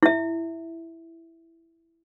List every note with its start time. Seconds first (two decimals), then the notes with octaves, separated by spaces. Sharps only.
0.03 E4 E5